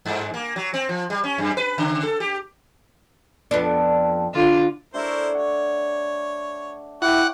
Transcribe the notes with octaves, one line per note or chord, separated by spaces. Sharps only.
G2
A#3
F#3
C4
F3
G3
C#4
F#2
B4
C#3
A4
G4
F2 B3 D4
D3 F4
A3 D4 E4 A#4 C5 C#5
C#5 F#5
E4 C#5 F#5 G5 D6